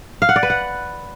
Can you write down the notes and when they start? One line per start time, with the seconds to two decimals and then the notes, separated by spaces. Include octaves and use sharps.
0.22 F5
0.29 F#5
0.36 D5
0.43 B4
0.50 F#5